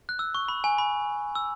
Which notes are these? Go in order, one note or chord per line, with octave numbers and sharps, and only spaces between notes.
F#6
E6
C#6
B5
G#5
B5
E6